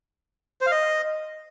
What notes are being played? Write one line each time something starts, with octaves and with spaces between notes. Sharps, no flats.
C5
F5
D#5